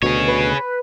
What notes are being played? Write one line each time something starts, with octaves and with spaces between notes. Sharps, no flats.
D2 B2 G#4 C#5
B4